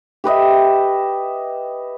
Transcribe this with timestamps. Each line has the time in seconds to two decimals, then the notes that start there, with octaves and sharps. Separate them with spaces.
0.24 G4 B4 D#5 E5